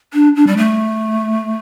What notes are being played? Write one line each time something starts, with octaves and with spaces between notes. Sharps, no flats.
D4
D4
G3
A3